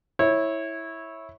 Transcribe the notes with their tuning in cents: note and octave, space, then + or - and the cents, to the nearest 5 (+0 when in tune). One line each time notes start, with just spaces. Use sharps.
E4 -10 C#5 -15